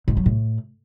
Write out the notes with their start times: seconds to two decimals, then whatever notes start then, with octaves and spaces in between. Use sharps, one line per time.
0.08 G#2
0.17 F#3
0.26 A2